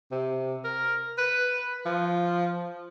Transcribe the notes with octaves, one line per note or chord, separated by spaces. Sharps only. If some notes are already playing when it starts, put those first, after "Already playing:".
C3
A#4
B4
F3